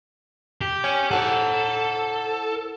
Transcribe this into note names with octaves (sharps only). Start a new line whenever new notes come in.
G4
C#5 G#5
E4 A4 C5 F#5